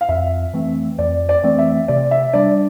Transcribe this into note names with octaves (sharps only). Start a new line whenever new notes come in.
F5
F2 E5
E3 A3 C4
F2 D5
D5
E3 A3 C4
E5
C3 D5
E5
G3 D4 D5